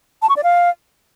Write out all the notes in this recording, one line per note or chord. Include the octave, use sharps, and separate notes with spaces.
A5
C#6
D5
F5